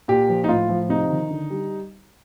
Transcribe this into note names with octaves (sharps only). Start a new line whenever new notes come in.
A#2 G4
F3
D#4
A2 F4
F3
C3 D#4
D#3
D3
G3